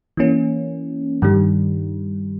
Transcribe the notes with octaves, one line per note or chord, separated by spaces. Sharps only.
E3 A#3 C#4
G2 D#3 G3